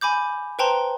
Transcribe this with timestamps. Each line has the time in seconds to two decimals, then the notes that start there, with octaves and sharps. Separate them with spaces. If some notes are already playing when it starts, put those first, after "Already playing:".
0.01 G#5 B5 D6 G6
0.59 B4 C5 G5 A5 A#5 C6